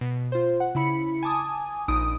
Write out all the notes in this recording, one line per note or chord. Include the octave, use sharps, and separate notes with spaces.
B2
F4 C5
F#5
C#3 E4 B5 C#7
G#5 A5 D6 D#6
A#1 D#4 D#6 D7